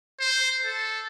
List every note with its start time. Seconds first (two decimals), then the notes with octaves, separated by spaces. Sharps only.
0.20 C5
0.65 A4